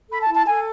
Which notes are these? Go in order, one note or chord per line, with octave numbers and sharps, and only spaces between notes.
A4 B5
A5
E4
A5
A4 G#5